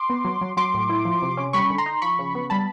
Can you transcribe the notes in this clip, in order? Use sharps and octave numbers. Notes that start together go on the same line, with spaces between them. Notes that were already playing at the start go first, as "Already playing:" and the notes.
Already playing: C6 D6
B3
F#3
F#3
F#3 C6 D6
A2
E4
F3
C3
C#4
G3 B5 C#6
D3
A#5 C6
D#4
F3 B5 C#6
C#3
B3
G3 A5 B5